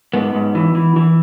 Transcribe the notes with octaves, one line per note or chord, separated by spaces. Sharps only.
G#2 B3
G#2
E3
E3
E3